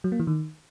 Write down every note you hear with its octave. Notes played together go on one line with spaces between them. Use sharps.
F#3
A#3
E3
D#3